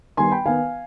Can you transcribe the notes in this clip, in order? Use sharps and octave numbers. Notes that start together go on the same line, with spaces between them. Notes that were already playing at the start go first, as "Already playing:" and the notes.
D#3 G3 B3 G#5 C6
G5 B5
D#3 B3 F5 G#5